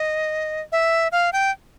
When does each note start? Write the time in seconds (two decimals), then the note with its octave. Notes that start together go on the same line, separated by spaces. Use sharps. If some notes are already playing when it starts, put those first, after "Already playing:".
Already playing: D#5
0.72 E5
1.12 F5
1.33 G5